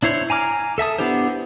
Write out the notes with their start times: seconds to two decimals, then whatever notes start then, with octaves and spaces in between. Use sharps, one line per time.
0.03 D4 E4 C5 C#5
0.30 G#5 A#5 D6 F6
0.78 A4 E5 A5 D#6
0.98 B3 D4 E4 G4 C5